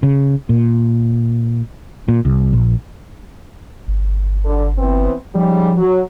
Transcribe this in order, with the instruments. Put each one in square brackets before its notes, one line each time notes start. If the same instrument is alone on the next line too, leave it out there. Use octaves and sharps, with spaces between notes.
[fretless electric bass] C#3
A#2
A#2
C2
A#1
[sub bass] G1
[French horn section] D3
E3 B3 C4
[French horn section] G#2 C#3 G3 [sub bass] F3
[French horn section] F#3